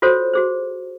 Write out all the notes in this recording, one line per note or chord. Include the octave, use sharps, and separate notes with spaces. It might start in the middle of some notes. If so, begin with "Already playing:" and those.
F4 F#4 A4 C5 C#5
F#4 G#4 C5